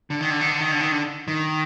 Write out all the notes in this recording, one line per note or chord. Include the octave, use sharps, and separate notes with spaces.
D3
D#3
D3
D#3
D3
D#3
D3
D#3
D3
D#3